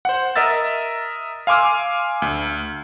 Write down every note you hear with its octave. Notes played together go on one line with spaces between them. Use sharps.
C5 F#5
A#4 D#5 E5 E6 A6
F5 G#5 C6 D6 E6 F6
D2